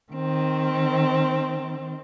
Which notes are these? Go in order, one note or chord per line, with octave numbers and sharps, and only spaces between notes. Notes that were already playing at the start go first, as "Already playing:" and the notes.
D#3 C4